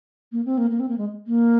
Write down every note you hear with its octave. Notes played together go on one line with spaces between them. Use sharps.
A#3
C4
A#3
A#3
C4
A#3
G#3
A#3